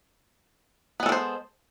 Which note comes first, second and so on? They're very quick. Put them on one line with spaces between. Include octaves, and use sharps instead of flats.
B3 G#3 A4 D4 C5